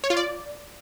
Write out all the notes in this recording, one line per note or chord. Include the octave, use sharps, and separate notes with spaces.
C#5
F4
D5